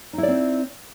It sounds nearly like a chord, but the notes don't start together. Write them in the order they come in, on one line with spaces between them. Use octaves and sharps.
D#4 E4 D5 C4